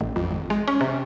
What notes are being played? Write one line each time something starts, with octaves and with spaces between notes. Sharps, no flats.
A1
F2
G#1
G#3
C#4
C3